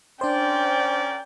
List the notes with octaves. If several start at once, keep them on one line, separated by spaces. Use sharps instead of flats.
C#4 D4 A#4 C5 D5 G5